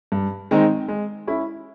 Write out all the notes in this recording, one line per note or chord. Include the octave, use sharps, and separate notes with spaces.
G2
D#3 G#3 C4 D#4
G#3
C#4 E4